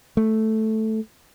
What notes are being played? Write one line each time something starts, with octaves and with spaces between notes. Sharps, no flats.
A3